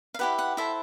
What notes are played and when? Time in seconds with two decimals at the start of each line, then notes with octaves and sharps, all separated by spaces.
0.14 F5
0.19 E4 G4 B4 F#5
0.39 F#5
0.57 E4 A4 C5 E5